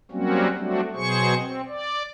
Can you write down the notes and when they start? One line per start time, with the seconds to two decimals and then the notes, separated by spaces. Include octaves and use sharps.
0.11 F#3 G3 A#3 C4 C#4 F#4
0.57 F#3 G3 A3 C4 D4 F#4
0.94 B2 F#3 G#4 C5 C#6
1.36 C4
1.68 D5